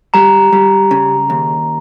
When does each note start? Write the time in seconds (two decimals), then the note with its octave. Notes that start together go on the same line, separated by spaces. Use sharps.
0.14 G3 A#5
0.52 G3
0.91 C#3
1.30 D#2